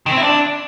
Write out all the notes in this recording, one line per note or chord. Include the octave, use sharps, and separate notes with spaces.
D#3
C4
E4
D4